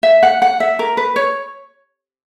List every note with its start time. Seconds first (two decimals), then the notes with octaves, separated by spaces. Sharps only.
0.03 E5
0.23 F#5
0.42 F#5
0.60 E5
0.79 A#4
0.97 B4
1.16 C#5